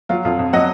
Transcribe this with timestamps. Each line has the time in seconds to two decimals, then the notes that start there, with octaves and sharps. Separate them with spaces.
0.09 F#3 F4
0.25 F2 F4
0.39 F2
0.53 F#3 D#5 F#5